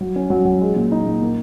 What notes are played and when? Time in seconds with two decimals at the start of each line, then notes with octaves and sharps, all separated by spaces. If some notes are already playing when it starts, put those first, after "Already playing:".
0.01 F#3
0.16 C#4
0.30 F#3
0.45 F#3
0.61 G#3
0.76 A#2
0.92 D#4
1.06 A#2
1.22 A#3